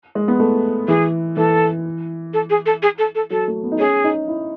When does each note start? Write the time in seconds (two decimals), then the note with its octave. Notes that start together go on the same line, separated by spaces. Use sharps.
0.15 G#3
0.28 B3
0.40 A3
0.88 E3 G#4
1.37 E3 A4
2.34 A4
2.50 G#4
2.66 A4
2.83 G#4
2.99 A4
3.15 A4
3.30 F#3 A4
3.48 A3
3.63 B3
3.72 D#4
3.79 C#4 G#4
4.04 D#4
4.28 E4